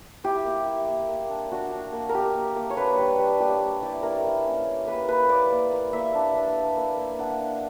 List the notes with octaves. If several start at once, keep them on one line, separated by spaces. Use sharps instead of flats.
E4 G4
A#3
E4
A#3
A#3
D4
D4 F#4
D4
A#3
A#4
A#3 G4
A#3
A#3
C#5
D4 B4
G3
G3
A#3 G4
A#3
E4 D5
E4 A#4
A#3
C#4
A#3
A#3 B4
A#3 B4
A#3 D5
A#3
A#3
A#3 E5
D4
D4
A#3
A#3
A#3
D4 F#5
D4